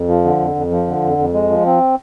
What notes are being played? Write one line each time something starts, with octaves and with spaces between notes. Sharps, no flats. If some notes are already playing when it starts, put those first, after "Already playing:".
Already playing: F2
F3
D3
F2
F2
F3
D3
F2
F2
G#3
F3
C4